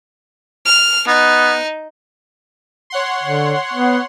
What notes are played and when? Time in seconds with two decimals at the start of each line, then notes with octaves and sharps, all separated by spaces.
0.65 F6
1.07 B3 D#4
2.90 C#5 F#5 C6
3.23 D3
3.73 B3